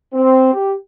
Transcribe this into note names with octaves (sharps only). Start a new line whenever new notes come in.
C4
G4